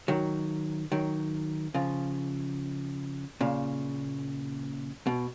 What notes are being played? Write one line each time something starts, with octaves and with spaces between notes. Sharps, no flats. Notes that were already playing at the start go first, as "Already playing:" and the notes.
D#3 F#3
D#3 F#3
C#3 F3
A#2 C#3
B2